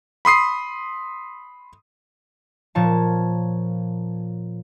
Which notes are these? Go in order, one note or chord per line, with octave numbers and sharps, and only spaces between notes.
B5 C6 D#6 C7
A#2 F3 C#5 A5